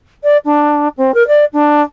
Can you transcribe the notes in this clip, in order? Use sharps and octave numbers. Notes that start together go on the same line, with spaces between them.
D5
D4
C4
A#4
D5
D4